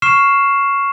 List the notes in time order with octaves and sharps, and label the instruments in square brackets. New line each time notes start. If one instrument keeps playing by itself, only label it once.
[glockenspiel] C#6 F6 C7 E7